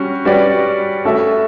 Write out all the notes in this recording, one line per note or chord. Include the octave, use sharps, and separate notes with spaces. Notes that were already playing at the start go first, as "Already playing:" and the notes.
Already playing: G3 C#4 F#4
G3 C#4 F#4 B4 D5
A3 C#4 F#4 A4 E5